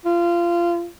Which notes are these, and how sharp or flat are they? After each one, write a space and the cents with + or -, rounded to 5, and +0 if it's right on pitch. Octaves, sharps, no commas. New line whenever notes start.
F4 -25